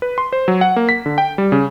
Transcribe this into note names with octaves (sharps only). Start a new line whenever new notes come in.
B4
C6
C5
F#3
F#5
A#3
B6
D3
G5
G3
C#3